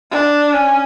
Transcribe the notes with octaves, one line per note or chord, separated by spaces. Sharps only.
D4
C#4